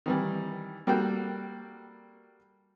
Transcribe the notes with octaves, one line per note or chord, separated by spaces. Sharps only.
D#3 E3 G3
G3 A#3 F#4 A4 G5